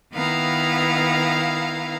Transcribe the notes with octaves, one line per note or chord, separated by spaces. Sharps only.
D#3 B3 E4 F5 A#5